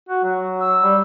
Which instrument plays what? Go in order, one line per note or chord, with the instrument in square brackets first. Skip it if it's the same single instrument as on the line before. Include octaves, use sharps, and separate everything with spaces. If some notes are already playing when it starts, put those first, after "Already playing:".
[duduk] F#4
F#3
[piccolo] E6
[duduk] G3